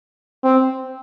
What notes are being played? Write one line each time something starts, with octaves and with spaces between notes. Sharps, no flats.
C4